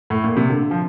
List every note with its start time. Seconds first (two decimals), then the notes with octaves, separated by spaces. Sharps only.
0.10 A2
0.24 A#2
0.37 C3
0.50 D3
0.71 F3